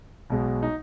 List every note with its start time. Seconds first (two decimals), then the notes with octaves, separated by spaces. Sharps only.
0.30 B1 B2 G#3
0.63 D#4